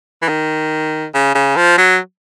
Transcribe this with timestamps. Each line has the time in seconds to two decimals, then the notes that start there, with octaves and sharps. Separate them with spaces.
0.22 E3
0.28 D#3
1.14 C#3
1.35 C#3
1.56 F3
1.78 F#3